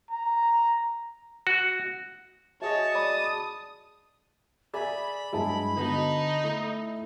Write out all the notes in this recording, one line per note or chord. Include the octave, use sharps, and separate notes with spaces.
A#5
F#4
F#4 G#4 C#5 D#5 E5 A5
D5 B5 D6 D#6
G#4 D5 E5 G#5 B5
G2 F#3 G#3 E4 G#4 A5
D3 B3 D#4 F#4 A5
A3 E4